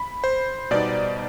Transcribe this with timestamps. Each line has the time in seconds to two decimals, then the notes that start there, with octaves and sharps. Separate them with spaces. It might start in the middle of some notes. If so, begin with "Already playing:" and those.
Already playing: B5
0.24 C5
0.71 B2 G3 B3 D#4 D5